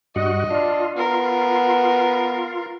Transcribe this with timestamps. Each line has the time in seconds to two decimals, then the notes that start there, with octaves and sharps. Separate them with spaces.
0.16 G2 F#4 D#5
0.51 D4 F4
0.97 B3 A#4